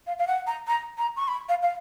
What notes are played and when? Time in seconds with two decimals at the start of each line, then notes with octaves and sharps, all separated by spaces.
0.07 F5
0.19 F5
0.27 F#5
0.47 A#5
0.68 A#5
0.98 A#5
1.16 C#6
1.28 B5
1.49 F5
1.62 F5